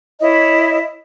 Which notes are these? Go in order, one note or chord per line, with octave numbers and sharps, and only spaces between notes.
E4 C#5 D#5